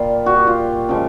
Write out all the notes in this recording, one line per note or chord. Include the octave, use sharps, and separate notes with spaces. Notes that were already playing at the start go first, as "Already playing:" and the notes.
Already playing: A#2 G3 F4
F#4
G4
F4
C#3 F3 G#3